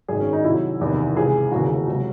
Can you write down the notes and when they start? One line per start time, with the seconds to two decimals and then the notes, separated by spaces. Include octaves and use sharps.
0.08 G#1 F#2 D#3 G#4
0.20 C#4
0.33 D#4
0.44 C2 C3 D#3 F#3 E4
0.80 F#1 E2 C3 D#3
1.16 C#2 C3 E3 G#4
1.51 E1 D#2 C#3 E3 F#4
1.87 C#2 C3 F#3